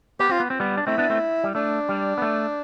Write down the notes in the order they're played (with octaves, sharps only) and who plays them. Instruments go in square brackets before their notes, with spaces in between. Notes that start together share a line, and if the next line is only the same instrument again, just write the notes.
[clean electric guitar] B3 [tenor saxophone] G4
[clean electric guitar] C4 [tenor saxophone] F4
[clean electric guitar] B3
C4
G3 B3
D4
[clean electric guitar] A3 C4 [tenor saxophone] E4
[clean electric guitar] B3 D4
A3 C4
G3
[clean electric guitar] A3 [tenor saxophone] D4
[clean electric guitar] G3
B3
A3